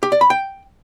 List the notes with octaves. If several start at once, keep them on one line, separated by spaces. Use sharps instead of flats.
G4
D5
B5
G5